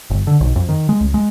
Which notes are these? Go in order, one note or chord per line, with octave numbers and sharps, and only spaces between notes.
G1
D3
B1
F2
D#3
G#3
C#2
G#3